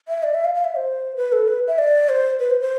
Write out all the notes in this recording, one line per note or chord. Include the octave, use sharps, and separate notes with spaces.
E5
D5
E5
F5
F5
E5
C5
B4
A4
B4
E5
D5
C5
B4
C5
C5